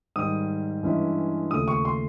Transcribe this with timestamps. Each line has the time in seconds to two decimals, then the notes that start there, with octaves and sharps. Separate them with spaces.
0.16 G#2 D#3 G3 D#6
0.83 G2 E3 G#3 C#4 E4
1.51 D#2 C#3 F3 A3 D#6
1.68 C#6
1.85 C6